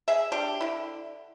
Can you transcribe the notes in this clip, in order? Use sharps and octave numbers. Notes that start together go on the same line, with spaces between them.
G#4 E5
G3 D4 G4
D3 E4